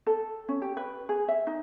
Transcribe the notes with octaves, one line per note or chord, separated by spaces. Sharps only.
A4
C#4
G4
B4
G#4
E5
D#4